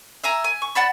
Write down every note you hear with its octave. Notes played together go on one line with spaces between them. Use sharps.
E5 G#5 A#5
G#5
C#6
D5 F#5 A5 B5